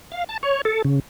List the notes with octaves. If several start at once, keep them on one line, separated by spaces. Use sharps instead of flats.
F5
A5
C#5
A4
C#3